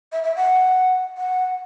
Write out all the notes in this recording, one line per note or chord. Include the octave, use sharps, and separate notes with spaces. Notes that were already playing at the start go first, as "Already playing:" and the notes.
E5
E5
F#5
F#5